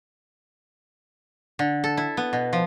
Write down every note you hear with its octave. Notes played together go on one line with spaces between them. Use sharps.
D3
A4
E4
B3
B2
F3